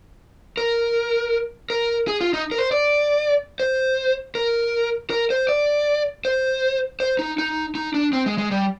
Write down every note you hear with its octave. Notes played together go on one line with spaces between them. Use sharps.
A#4
A#4
G#4
F4
D#4
A#4
C5
D5
C5
A#4
A#4
C5
D5
C5
C5
D#4
D#4
D#4
D4
C4
G#3
G#3
G3